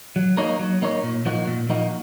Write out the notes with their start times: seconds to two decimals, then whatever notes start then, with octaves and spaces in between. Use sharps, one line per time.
0.16 F#3
0.37 A#3 D#4 A#4 C#5
0.59 F#3
0.82 A#3 D#4 A#4 C#5
1.03 A#2
1.25 F3 A#3 D#4 F#4
1.48 A#2
1.69 F3 A#3 D#4 F#4